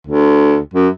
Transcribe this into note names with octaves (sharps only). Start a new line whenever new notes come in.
D2
F#2